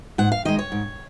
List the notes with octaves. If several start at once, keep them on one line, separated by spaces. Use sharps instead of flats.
G#2 F#5
F5
D#3 G#3 D#5
C#5
G#2